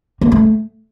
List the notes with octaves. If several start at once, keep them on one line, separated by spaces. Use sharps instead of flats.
A#3
A3